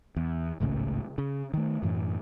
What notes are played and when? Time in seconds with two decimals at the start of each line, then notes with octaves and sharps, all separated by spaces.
0.16 E2
0.60 G#1 C#2 A2 C#3
1.18 C#3
1.54 D#3 A3
1.83 F#2 A2 E3